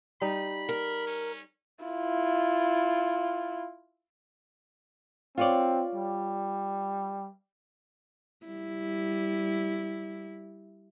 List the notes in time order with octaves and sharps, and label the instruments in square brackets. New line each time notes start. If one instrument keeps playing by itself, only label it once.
[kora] G3 D#4 [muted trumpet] B5
[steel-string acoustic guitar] A#4
[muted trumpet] C#4
[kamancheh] E4 F4
[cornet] C4 [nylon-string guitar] F4 C#5 D5
[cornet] G3
[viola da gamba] G3 E4